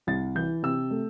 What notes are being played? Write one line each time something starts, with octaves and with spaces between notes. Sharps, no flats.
C2 A6
E3 G6
C3 E6
A3